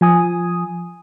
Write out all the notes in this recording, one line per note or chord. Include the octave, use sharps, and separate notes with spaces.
F3 G#5 D#6